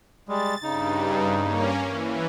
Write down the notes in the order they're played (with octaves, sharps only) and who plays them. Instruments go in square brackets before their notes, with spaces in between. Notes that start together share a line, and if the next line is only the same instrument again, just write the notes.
[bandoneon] G3 G#3 [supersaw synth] A6
[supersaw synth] G2 [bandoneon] C#3 D#4
[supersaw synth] A#3 C#4
E3